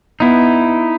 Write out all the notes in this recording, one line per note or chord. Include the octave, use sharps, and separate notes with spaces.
B3 D#4 E4